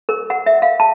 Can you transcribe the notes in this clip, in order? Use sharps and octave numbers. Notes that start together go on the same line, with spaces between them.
A#4
F#5
E5
F5
A5